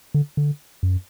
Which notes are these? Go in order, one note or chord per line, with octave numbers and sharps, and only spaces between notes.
D3
D3
F#2